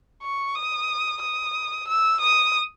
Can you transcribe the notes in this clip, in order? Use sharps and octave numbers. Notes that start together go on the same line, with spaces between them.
C#6
D#6
D#6
E6
D#6